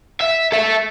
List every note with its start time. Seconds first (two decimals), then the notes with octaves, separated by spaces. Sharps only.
0.21 E5
0.52 A4 E5